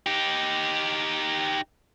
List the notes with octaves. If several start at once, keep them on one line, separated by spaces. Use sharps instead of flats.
D#4 G4